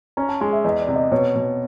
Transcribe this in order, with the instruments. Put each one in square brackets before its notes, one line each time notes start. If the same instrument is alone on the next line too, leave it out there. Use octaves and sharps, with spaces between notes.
[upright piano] C#4 [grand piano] A#5
[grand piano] A5
[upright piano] G#3 [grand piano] G#5
[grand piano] E5
[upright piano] E2 [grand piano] D#5
[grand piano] D5
[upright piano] C3
[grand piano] D#5
[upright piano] B2 [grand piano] C#5
[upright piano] B2